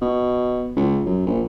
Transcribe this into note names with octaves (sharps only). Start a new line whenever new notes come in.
B2
C#2
F#2
A#1